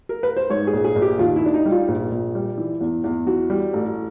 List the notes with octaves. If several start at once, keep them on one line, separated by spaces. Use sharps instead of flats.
A#4
B4
C5
G#2 C#5
G#4
A#1
G#4
A#1
G4
D#2 F4
E4
D#3 D4
D#4
G3
F4
A#1
A#1
G3
E3
E2
E2
E3 F#4
G3
A1